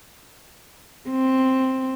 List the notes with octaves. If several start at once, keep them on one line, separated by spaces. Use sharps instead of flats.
C4